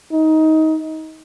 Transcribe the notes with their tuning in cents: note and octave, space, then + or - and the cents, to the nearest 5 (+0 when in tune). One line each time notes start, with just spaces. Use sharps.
D#4 +20